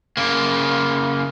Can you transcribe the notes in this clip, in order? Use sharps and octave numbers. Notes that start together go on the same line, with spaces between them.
C#3 A#3